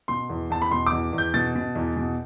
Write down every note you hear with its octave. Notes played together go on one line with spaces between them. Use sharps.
B2 C6
E2
E2 A5
B5
B2 C6
D6
E2
E2
G6
B2 A6
B2
E2
B2